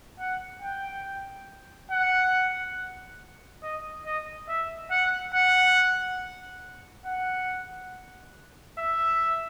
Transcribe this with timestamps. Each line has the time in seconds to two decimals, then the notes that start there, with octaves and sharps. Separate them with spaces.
0.20 F#5
0.62 G5
1.91 F#5
3.63 D#5
4.06 D#5
4.48 E5
4.91 F#5
5.34 F#5
7.06 F#5
8.78 E5